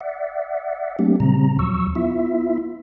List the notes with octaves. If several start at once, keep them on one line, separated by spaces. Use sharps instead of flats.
D5 E5 F#5
F#3 A3 A#3 C4 D4 G4
A#2 C#3 G3 C4 A#5
D#2 F3 F#3 C#6 E6
B3 E4 F4 E5